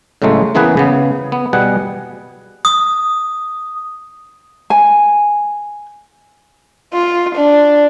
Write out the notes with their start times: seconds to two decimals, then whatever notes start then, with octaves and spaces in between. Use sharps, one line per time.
0.22 A2 C#3 F#3 G#3 A3
0.55 C#3 E3 A#3 B3 G#4 B4
0.77 C#3 B3
1.32 B3
1.53 B2 G3 G#4 F#5
2.65 D#6
4.70 G#5
6.93 F4
7.35 D4